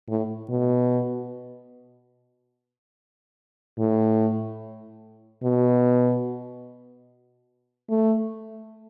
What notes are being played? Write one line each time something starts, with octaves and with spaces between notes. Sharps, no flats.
A2
B2
A2
B2
A3